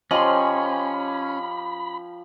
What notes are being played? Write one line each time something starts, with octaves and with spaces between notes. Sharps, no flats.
F3 C#4 G4 D#5 B5 C6